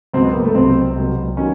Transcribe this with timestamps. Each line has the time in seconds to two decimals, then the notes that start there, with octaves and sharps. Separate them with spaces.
0.14 C#2 B2 F#3 C4
0.24 B3
0.34 A#3
0.45 A3
0.55 C2 B2 F#3 C4
0.96 C2 B2 F#3
1.37 D#3 F#3 C#4